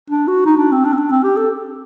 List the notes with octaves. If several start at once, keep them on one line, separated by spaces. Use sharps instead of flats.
D4
F#4
D#4
D4
C4
D4
C4
D4
C4
G4
A4